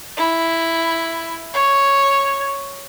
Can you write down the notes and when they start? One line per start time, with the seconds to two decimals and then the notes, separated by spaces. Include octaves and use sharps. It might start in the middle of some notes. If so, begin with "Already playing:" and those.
0.17 E4
1.54 C#5